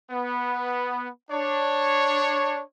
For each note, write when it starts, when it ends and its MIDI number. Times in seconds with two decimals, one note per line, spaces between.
0.11 1.08 59
1.30 2.62 62
1.30 2.62 73